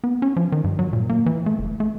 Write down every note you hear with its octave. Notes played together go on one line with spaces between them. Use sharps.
B3
C#4
F3
D#3
G2
F#3
A#2
A#3
E3
A3
F#1
A3